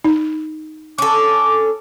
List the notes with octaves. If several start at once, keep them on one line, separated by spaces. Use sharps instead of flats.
D#4
C#4 A4 D6